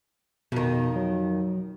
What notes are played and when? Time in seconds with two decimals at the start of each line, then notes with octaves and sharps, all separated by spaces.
0.52 F2 B2 D#3
0.96 F#3